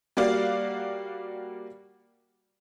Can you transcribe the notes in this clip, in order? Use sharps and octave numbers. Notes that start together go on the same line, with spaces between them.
G3 A#3 F#4 D5 F5